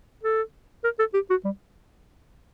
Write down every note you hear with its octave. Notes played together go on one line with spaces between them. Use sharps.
A4
A#4
A4
G4
F#4
G3